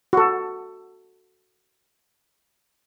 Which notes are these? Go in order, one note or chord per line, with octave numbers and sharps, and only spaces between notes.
F#4 A4